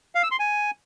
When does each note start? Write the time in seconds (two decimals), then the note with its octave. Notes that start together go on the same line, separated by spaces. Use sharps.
0.15 F5
0.23 E6
0.31 C6
0.39 G#5